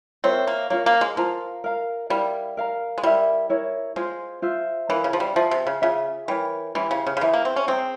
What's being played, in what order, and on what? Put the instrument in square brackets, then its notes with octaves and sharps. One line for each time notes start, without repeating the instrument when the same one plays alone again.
[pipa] C4 [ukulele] F4 A#4 C#5 E5
[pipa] A#3
[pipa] A#3 [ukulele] C#4 F4 A#4 C#5
[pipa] A#3
G#3
[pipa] F3 [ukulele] F4 A#4 F5 A#5
[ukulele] A#4 F5 A#5
[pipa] G3 [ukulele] E4 A#4 F5
[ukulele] A#4 F5 A#5
[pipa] G#3
[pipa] G3 [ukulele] E4 A#4 E5
[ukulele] E4 A#4 C#5
[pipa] G#3 [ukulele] F4 G#4 C5
[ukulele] F4 C5 E5
[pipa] E3 [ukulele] C#4 E4 A#4 F5
[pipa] C#3
F3
G3
[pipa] F3 [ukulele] G#4 E5 G#5
[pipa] C3
C#3
[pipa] C#3 [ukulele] F4 G#4 E5 G#5
[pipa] E3 [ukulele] A#4 C#5 G5
[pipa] E3 [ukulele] C#4 E4 G4 C5
[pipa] C#3
C#3
C#3
[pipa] E3 [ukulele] G#4 C5 E5 A#5
[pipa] A#3
C4
C#4
[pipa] C4 [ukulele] G#4 C5 G5 A#5